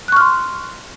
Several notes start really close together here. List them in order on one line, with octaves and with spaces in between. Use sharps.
F#6 C#6 F6 C6